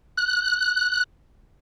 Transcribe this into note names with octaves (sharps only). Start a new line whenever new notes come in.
F#6